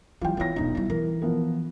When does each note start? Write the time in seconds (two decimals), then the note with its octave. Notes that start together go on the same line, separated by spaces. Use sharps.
0.21 E3 G3 F4 G5
0.37 E3 B3 F4 C#5 A#6
0.56 D#1 B1 D4 D#4
0.75 G3 E4
0.90 E3 A#4
1.22 F3 B3 A#4